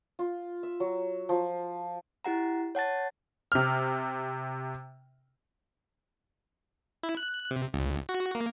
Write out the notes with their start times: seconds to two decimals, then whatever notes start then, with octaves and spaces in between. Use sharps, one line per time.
0.19 F4
0.63 E5
0.80 F#3
1.29 F3
2.25 E4 G4 F#5 A#5
2.75 C#5 F#5 A5 A6
3.52 C3 F6
7.03 E4
7.17 F#6
7.51 C3
7.74 C#2
8.09 F#4
8.35 A#3